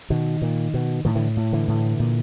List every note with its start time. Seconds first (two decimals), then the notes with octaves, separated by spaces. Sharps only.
0.10 B2 D#3
0.42 A#2
0.74 B2
1.05 A2 D#3
1.15 D3 E3
1.37 A2
1.53 D3 E3
1.68 A2
2.00 A#2